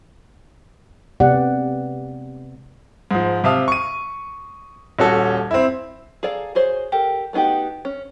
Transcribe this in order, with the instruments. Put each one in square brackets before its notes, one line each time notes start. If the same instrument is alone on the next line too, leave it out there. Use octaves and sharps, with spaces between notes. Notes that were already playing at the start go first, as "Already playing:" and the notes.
[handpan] C3 G#3 B3 G4 D5 F#5
[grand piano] G#2 F3
C3 E5 F5 A5 D#6
C#6 D#7
D#1 C#4 F#4 A4
C4 E4
[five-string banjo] G#4 A4 D5 F5 A#5
F#4 G#4 C5 C#5
G4 A4 A#4
A3 B3 D#4 F#4 G4
C#4